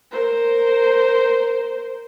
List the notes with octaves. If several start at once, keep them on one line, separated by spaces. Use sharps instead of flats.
A#4 C5